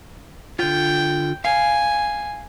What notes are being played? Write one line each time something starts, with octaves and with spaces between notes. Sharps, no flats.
D3 F4 G5
F5 G#5